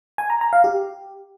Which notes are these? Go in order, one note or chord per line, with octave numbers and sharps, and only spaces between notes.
G#5
A#5
A#5
F5
G4